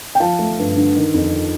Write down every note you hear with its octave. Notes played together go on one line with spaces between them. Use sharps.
G5
F3 F5 A5
A3
G2
D3
D#3
F2